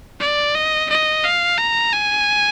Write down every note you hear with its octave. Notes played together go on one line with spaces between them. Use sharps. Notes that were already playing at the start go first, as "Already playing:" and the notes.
D5
D#5
D#5
F5
A#5
G#5